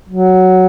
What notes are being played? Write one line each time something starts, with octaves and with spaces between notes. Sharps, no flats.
F#3